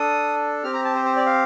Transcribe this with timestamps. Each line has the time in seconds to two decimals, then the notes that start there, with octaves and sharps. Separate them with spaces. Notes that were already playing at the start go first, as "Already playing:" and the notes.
Already playing: D4 A4 D#6
0.64 C4 G4 F6
0.73 A#5
0.85 A5
0.95 C5
1.05 C5
1.16 D5
1.26 F5